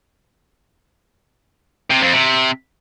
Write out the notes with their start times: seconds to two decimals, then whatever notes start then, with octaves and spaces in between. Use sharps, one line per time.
1.90 C3
2.02 F2
2.13 C3